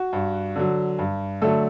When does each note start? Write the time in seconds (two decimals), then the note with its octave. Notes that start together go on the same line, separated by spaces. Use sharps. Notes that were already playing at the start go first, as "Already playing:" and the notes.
Already playing: F#4
0.13 G2
0.56 D3 F#3
0.99 G2
1.42 D3 F#3 A3 A4